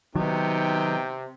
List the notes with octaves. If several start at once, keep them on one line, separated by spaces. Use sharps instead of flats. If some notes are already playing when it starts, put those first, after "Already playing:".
C3 D#3 F#3 B3 D#4 G5